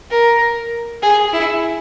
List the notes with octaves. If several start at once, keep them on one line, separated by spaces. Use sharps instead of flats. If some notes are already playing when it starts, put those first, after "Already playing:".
A#4
G#4
E4